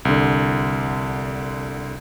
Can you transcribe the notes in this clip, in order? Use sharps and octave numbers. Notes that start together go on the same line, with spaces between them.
C2 D3